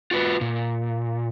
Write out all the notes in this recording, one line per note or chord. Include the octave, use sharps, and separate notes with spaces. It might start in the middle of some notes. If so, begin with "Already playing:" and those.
F4 F#4 B4
A#2